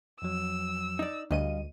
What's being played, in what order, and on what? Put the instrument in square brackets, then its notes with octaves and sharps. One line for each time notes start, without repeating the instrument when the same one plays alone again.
[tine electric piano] F2 F3 F#3 [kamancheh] E6
[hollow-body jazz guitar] D#4 D5
[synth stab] D2 D#7 [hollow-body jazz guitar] G2 D#5 [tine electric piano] F5